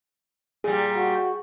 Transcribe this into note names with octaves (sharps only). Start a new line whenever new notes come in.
A#2 G3 G#4
F#4